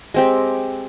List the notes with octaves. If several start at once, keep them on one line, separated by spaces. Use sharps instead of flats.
G#3 C4 G4